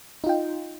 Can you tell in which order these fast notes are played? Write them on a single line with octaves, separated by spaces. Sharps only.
D#4 F4 G5